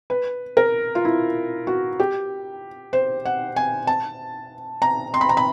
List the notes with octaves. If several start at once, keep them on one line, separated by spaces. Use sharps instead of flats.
B4
A#4
F4
E4
F#4
G4
C5
F#5
G#5
A5
A#5
C6
B5
A#5
B5